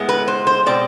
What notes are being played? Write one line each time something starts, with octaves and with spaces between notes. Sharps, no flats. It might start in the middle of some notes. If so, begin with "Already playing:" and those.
Already playing: A2 G#3 B3
B4
C5
C5
B2 G#3 C4 D5